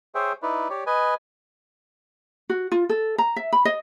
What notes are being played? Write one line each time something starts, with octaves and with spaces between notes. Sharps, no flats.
G#4 C5 C#5 E5 G5
D#4 E4 B4 D5
G4 C#5 D5
B4 D#5 G#5
F#4
F4
A4
A#5
E5
B5
D#5